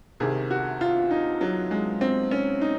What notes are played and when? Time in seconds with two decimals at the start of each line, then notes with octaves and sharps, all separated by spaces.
0.20 C2 C3 D#3 G#4
0.51 F#4
0.81 F4
1.11 D#4
1.41 F#3
1.71 G#3
2.01 C4
2.31 C#4
2.61 D#4